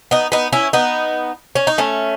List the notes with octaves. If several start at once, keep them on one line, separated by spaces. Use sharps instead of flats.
B3 D#4
B3 D#4
C#4 E4
B3 D#4
C#4
D#4
A3 C#4